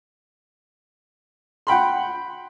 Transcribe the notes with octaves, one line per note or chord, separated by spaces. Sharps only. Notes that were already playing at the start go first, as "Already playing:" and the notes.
F#5 G5 B5 C6